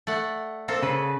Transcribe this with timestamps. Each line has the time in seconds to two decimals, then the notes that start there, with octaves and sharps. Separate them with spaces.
0.07 A3 D5 F#5
0.68 A#3 C4 A4
0.83 C#3 B4